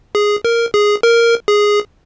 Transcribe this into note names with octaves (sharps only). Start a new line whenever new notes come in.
G#4
A#4
G#4
A#4
G#4